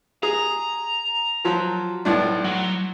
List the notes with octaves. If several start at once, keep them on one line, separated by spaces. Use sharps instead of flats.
G#4 A#5
F3 F#3
B1 A2 D4
F#3